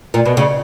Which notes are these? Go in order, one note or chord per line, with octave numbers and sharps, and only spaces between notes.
A#2
B2
C#3